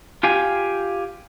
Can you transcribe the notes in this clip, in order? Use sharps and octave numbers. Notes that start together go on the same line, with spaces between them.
F4 G4 F5 G#5